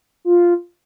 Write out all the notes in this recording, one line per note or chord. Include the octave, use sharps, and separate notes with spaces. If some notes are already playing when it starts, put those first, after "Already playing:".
F4